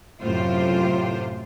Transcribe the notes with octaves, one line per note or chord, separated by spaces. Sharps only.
F#2 A2 C3 F4 C5